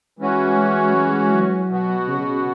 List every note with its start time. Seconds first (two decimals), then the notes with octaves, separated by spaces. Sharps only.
0.19 E3 G#3 C#4 F#4
0.57 G#3
0.94 G#3
1.32 F#3
1.70 B2 B3 F#4
2.08 C#3